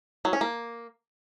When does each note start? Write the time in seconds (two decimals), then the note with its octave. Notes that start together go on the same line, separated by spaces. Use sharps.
0.25 F#3
0.33 C#4
0.41 A#3